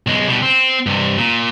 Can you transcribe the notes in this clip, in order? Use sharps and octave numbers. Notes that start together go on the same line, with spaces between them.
B1 G#3
B2 G3
C4
G2 C3
A#2